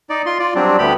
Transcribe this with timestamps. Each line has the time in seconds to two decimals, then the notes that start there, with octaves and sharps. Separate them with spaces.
0.10 D#4 D5
0.26 F4 C6
0.39 F4 D5
0.55 F#3 G3 C4 D4
0.78 D2 B3 G4 B5